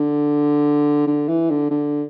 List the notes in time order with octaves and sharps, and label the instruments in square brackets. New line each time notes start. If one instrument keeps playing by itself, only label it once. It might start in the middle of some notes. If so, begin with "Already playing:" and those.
Already playing: [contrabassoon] D3
D3
E3
D3
D3